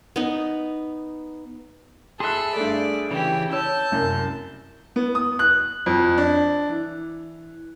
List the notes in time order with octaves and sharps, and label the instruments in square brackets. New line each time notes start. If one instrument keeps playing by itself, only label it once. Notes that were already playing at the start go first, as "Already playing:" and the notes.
[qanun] B3 D#4
[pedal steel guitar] G#4 E5 [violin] A4 B5 [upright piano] C6 F#6
[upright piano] G2 A3 [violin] D5
[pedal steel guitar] C#3 E3 [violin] E4 G4
[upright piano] C#5 [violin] A5 G6 [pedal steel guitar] E6
[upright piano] C2 F#2
B3
D#6
F#6
F2
D4
E3